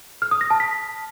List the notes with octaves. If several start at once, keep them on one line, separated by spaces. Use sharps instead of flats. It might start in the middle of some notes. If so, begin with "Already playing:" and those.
F6
D#6
A#6
A5
B6